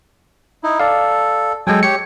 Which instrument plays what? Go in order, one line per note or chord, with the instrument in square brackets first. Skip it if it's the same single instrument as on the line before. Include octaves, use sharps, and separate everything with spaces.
[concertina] D#4 E4
[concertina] A4 [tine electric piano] D5 F5
[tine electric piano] F#3 G#3 [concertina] A4 G5 G#5
[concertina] G4 C#5 [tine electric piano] C#7